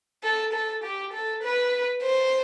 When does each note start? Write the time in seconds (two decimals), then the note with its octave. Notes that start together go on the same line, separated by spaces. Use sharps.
0.23 A4
0.53 A4
0.84 G4
1.13 A4
1.42 B4
2.02 C5